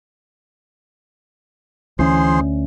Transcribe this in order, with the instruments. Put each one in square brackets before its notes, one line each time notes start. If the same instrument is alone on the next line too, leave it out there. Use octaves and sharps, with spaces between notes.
[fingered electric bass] D2 C#4 [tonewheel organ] E3 C6 [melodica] G#4 C5